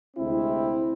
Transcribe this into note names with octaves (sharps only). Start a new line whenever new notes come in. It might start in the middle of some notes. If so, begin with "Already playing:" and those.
D2 C3 G#3 C4 E4